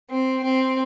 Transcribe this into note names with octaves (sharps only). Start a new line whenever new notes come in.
C4
C4